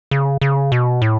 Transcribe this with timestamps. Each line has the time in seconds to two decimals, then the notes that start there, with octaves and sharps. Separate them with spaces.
0.11 C#3
0.41 C#3
0.72 B2
1.02 A2